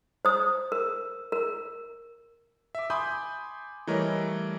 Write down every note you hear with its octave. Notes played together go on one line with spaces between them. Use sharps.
C5 D#6
A#4
A#4
E5 D6
G#5 B5 C6 D6 D#6 G6
E3 G3 A3 A#4 C#5 D#5